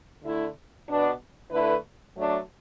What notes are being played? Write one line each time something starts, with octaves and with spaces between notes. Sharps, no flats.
D3 A3 E4
B2 B3 D4
D3 A3 E4 B4
F#3 A3 D4